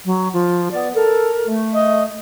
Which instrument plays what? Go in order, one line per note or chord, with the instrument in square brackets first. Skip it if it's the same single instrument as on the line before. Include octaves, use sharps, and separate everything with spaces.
[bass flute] F#3
F3
[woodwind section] B3 [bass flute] D5
[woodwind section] A4 [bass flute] A#4
[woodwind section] A3
[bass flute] D#5